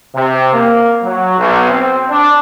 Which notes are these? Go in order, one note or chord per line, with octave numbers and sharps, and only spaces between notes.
C3
A#3
F#3
B1
C4
D4